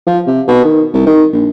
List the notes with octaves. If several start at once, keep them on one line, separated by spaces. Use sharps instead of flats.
F3
C3
B2
D#3
C2
D#3
A#1